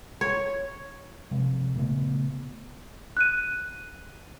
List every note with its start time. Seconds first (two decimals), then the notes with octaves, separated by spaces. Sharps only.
0.21 C#5
1.31 C3 F3 G#3
1.75 A#2 C#3 A3 B3
3.17 F#6 D#7